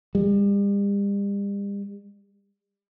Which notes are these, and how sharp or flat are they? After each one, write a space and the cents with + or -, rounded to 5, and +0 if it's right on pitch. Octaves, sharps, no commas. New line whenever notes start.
G3 +40